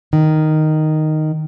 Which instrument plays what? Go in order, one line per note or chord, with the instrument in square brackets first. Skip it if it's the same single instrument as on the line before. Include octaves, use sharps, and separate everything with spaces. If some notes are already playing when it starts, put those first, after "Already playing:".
[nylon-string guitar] D#3